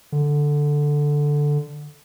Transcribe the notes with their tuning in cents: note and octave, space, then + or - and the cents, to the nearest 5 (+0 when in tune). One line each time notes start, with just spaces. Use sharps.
D3 +0